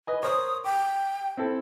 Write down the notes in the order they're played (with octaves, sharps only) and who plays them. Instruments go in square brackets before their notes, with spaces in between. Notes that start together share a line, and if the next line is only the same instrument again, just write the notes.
[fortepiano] B4 D#5 G#5
[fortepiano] A#4 C5 C#5 [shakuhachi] D#6
[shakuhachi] G5 [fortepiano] D6
[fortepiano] C4 E4 A4